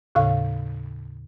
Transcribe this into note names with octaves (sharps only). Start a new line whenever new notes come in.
D#2 A2 C#3 F5